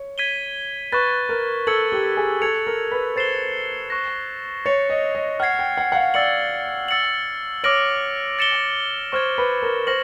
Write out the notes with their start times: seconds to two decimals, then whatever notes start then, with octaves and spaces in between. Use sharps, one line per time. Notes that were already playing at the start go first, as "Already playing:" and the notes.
Already playing: C#5
0.18 G#6 B6 D#7 G7
0.92 B4 C#6 F#6 A6
1.29 A#4
1.67 A4 E6 G#6 C#7 F#7
1.92 G4
2.17 G#4
2.41 A4 G#6 C#7 F7
2.67 A#4
2.91 B4
3.16 C5 A6 C7 E7 G7
3.90 C#6 F#6 A#6
4.65 C#5 A6 C#7 F7
4.90 D#5
5.15 D#5
5.40 F#5 F6 G#6 C7
5.59 G5
5.77 F#5
5.92 F#5
5.95 F5
6.14 D5 E6 A6 C#7 F#7
6.88 E6 A6 C#7 F#7
7.64 C#5 D6 F6 A#6 D7 F#7
8.39 A6 C#7 E7 G7
9.12 C5 C#6 F6 G#6
9.38 B4
9.62 A#4
9.87 C5 C#6 F6 A#6 C#7 F#7